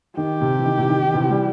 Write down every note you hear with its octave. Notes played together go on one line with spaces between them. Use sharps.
D#3 G4
C3
E3
D#3
C3 E3
D#3
D#3
C3 E3
E3 G3